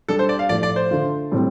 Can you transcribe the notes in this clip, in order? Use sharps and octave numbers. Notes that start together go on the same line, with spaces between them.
G3 D4 G4 A4
C5
D5
F5
A2 F3 A3 F4 D5
D5
C5
D3 A3 F4
A2 G3 C4